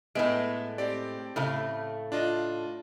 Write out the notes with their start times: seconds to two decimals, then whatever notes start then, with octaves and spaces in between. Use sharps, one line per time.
0.15 A2 G#3 B3 E5 D7
0.78 C4 G4 D5
1.36 A2 C#3 A3
2.12 D4 F4 D#5